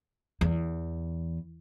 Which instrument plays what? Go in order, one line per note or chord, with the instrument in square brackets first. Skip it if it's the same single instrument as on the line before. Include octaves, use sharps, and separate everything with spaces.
[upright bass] E2